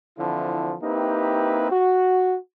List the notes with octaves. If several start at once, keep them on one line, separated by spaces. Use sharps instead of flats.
D3 E3 F3 C4 E4
A#3 C4 D#4 E4 G4 B4
F#4